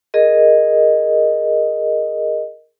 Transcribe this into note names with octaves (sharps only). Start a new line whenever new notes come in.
G#4 A#4 D#5